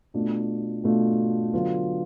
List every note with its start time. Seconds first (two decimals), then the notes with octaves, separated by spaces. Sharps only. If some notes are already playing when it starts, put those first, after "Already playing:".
0.14 B2 A3 D4 F4
0.84 B2 A3 D4 F4
1.53 D3 F#3 B3 F4